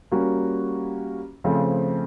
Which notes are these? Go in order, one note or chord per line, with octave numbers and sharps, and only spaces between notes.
G3 A#3 C#4 F#4
C#3 F3 A3 C4